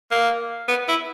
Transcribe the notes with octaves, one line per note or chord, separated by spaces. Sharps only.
A#3
B3
E4